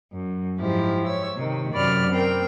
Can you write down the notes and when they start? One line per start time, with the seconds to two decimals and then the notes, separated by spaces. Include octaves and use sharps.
0.12 F#2
0.58 G#2 F3 E4 G4
1.06 C#5 E6
1.36 C3 D#3
1.72 F#2 C3 D5 B5 F6
2.09 C4 A#4 G5